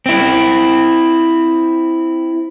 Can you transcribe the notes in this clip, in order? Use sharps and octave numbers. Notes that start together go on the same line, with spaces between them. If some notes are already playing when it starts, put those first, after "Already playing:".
C4 E4